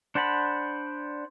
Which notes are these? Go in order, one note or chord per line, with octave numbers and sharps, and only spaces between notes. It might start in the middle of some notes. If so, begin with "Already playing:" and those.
D4 C5 F#5 A5 B5